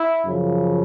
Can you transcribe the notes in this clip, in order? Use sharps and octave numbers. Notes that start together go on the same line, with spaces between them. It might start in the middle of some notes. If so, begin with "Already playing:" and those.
Already playing: E4
F#2 C#3 F3